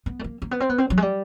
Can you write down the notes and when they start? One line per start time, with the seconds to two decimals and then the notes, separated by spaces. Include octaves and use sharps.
0.06 B3
0.19 A3
0.24 A#3
0.42 A#3
0.51 B3
0.60 C4
0.70 B3
0.78 C4
0.90 F#3
0.97 G#3
1.02 G3